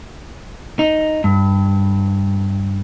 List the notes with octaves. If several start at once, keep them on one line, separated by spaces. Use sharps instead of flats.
D#4
G2